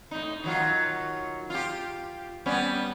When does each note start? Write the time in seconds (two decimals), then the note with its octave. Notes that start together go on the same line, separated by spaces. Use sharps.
0.11 A2 D#4
0.44 D#3 F#3 F4
1.50 F4 G4
2.46 G3 B3 C#4